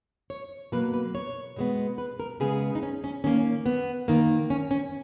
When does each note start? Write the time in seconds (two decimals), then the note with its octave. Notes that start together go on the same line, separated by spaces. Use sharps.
0.30 C#5
0.72 B2 F#3 A#3 B4
0.94 B4
1.15 C#5
1.56 B2 G#3 B3
1.98 B4
2.20 A#4
2.40 C#3 G#3 B3 G#4
2.75 D#4
2.83 C#4
3.04 C#4
3.24 D#3 A#3 C#4
3.66 B3
4.08 D#3 A#3
4.50 C#4
4.71 C#4